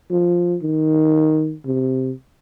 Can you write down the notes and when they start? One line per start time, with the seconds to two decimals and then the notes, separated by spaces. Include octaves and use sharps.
0.10 F3
0.62 D#3
1.65 C3